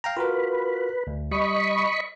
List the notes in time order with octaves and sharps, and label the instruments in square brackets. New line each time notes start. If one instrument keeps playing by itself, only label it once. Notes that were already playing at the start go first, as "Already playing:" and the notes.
[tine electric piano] F5 G5 A#5
[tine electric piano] F4 F#4 A#4 [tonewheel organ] B4
[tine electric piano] D2
[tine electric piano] G3 [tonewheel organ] D#5 B5 C#6